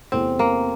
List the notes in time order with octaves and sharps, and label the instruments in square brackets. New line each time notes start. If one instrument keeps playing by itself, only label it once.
[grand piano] E2 C3 E3 A3 [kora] C4
[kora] A#3